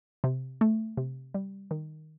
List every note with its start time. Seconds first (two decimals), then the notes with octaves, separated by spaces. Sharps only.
0.24 C3
0.61 A3
0.97 C3
1.34 G3
1.71 D#3